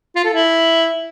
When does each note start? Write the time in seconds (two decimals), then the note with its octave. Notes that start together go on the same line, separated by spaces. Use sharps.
0.16 F4
0.24 A4
0.33 E4